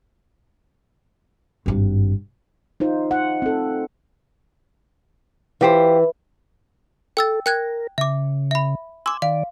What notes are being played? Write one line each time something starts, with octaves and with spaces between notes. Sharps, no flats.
G#1 G2
D#4 F4 C5
F#5
C4 A4
E3 F4 G4 C5
A4 G5 E6 A6
A#4 G5 F#6 G#6
C#3 E5 D6
E5 B5
G#5 C6 D6 E6
D#3 D5 F5